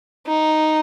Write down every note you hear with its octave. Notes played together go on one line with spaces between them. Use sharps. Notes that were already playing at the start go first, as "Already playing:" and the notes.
D#4